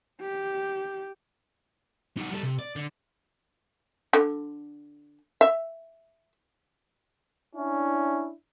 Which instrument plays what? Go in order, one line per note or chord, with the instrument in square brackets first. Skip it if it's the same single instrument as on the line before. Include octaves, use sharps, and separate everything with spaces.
[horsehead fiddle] G4
[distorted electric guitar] D#4 F#4
G3 A4
C3
D5
D3
[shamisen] D3
E5
[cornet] C#4 [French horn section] D4 E4